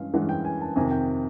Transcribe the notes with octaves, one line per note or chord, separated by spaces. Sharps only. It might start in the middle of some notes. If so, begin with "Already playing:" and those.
Already playing: G2 E3 G#3 C#4 F5
G2 E3 G#3 C#4 F#5
G5
G#5
A5
F2 C3 D#3 G#5
G5